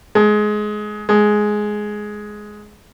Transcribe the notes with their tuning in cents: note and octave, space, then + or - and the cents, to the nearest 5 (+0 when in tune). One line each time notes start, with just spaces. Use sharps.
G#3 +20
G#3 +10